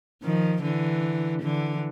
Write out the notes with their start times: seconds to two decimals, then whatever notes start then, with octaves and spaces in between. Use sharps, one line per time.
0.23 D#3 F3
0.62 D3 E3
1.42 D3 E3